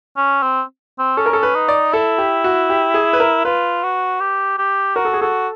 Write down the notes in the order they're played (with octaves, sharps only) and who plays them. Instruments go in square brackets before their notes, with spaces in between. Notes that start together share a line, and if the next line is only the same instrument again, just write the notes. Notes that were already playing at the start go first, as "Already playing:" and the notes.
[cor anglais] C#4
C4
C4
[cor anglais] C#4 [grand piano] A4
[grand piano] A#4
A4
B4
[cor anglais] D#4
[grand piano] D5
[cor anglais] E4 [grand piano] A4
[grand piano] G4
F#4
G4
G#4
B4
A#4
[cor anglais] F4 [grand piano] B4
[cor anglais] F#4
G4
G4
[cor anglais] F#4 [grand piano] A#4
[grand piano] A4
G#4
[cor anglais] F#4 [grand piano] A4